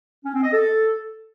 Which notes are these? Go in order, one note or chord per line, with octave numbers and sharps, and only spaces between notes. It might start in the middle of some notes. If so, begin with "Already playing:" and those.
C#4
C4
D#5
A4